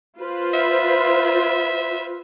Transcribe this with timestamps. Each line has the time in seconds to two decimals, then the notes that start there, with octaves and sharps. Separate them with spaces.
0.19 F4 B4 C5
0.54 E5